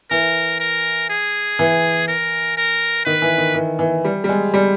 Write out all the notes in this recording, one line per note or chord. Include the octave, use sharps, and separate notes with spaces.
E3 A#4
A#4
G#4
E3
A#4
A#4
D#3 B4
E3
D#3
E3
E3
G3
G3
G#3
G3